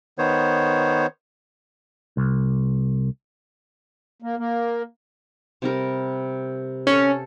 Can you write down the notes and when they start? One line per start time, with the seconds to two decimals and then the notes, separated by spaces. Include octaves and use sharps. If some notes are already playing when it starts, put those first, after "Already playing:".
0.18 D#3 B3 C5 C#5
2.17 C2
4.22 A#3
4.37 A#3
5.62 C3 G3 A#4
6.87 C#4 A4